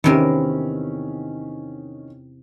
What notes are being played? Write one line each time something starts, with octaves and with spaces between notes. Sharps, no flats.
E2 C3 D#3 C#4 A#4